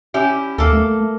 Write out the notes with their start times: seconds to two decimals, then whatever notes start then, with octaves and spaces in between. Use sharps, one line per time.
0.14 C#4 E4 G4
0.58 D#2 A#3 A4
0.73 A3